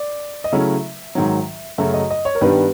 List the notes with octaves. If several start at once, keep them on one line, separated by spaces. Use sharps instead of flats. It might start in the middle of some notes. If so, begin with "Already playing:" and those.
Already playing: D5
D#5
C#3 F#3 A3 C#4 E4 E5
G#2 D#3 F#3
F#2 C#3 F#3 A3 E5
D#5
D#5
C#5
A#4
G2 D#3 G3 B3 D4 B4